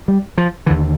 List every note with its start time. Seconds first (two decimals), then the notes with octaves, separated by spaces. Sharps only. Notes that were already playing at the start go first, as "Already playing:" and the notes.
0.08 G3
0.38 F3
0.66 D#2 D3 E3